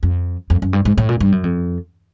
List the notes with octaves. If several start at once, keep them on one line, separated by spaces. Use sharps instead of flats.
F2
F2
F#2
G2
G#2
A2
A#2
G2
F#2
F2